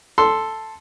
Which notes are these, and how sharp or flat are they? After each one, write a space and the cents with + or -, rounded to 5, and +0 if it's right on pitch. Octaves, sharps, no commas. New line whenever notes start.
A4 +0 C6 +0